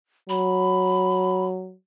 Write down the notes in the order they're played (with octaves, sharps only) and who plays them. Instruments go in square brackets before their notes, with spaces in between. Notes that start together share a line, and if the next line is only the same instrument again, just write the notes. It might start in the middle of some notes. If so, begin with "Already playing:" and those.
[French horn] F#3 [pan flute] B5